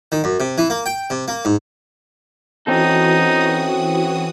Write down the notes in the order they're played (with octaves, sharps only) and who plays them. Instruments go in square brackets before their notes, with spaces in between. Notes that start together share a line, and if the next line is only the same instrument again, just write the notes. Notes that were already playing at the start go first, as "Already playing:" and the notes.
[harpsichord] D#3
F#2
C3
E3
A#3
G5
C3
A#3
G#2
[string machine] E3 F#4 D#6 [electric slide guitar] C4 C#4 A4 [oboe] D#4